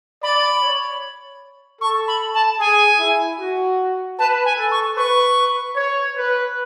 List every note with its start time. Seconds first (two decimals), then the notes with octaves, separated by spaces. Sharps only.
0.23 D5 B5
0.63 C#5
1.81 A4 C#6
2.08 B5
2.34 A5
2.60 G#4 G#5
3.00 E4
3.39 F#4
4.19 B4 A5
4.45 G#5
4.58 A4
4.71 C#6
4.97 B4 C#6
5.76 C#5
6.17 B4